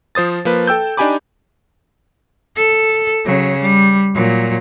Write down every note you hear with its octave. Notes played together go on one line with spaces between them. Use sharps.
F3 C5 D#6 A6
F3 A#3 B4
A4 G5 E6 G6
D4 D#4 G4 G#5 B5 D6
A4
C#3 F#3
G3
A#2 F#3